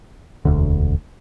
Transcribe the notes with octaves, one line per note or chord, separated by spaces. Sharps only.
E1 D2 D3